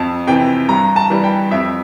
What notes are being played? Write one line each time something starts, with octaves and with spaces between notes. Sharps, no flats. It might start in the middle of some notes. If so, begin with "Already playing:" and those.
Already playing: F2 A5
C3 E3 G5
G2 A#5
A5
E3 G3
G5
F2 E5